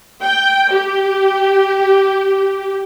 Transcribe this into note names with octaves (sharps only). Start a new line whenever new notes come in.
G5
G4